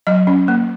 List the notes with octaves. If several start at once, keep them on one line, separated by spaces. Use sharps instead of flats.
F#3 D#5
C#4
A#3